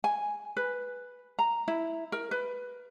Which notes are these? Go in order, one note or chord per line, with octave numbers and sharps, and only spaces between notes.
G#5
B4
A#5
E4
A#4
B4